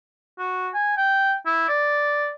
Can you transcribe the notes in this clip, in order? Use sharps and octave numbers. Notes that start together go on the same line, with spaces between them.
F#4
G#5
G5
E4
D5